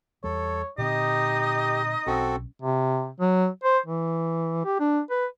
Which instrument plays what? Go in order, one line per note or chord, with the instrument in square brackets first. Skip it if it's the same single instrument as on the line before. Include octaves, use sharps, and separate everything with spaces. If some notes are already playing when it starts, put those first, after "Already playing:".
[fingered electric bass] E2 G3 [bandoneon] A4 [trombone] C#5
[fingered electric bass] A#2 D3 C4 [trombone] D#4 [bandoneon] G4 [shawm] D#5
[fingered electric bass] B1 C#4 [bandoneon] C4 F#4 A4
[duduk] C3
F#3
C5
E3
G4
D4
B4